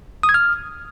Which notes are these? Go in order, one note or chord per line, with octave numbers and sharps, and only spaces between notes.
D#6
G#6
F6